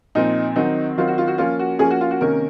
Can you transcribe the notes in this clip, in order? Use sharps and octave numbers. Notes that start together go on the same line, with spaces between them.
A#2 F3 C4 D#4
D#3 F#3 C4 D#4
D#3 F#3 C4 F4
F#4
F4
F#4
F3 A#3 C#4 F4
F#4
F3 A#3 C#4 G#4
F#4
F4
F#4
C3 D#3 A#3 C#4 A#4